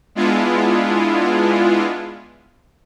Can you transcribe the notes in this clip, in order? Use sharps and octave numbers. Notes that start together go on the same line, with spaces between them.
G#3 B3 D4 E4 F4